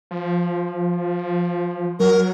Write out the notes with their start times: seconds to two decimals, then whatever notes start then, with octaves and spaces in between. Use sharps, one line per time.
0.11 F3
2.00 F#3 A#4